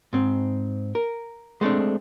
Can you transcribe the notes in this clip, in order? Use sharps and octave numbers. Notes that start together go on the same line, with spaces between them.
G#2 C4
A#4
G#3 A3 C4 D4